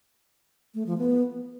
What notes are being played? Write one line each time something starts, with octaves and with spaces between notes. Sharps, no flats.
A3
F3
B3